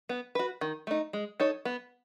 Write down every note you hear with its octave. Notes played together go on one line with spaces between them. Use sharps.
B3
F#4 B4
D#3
A3 D#4
G#3
D#4 A4 C#5
B3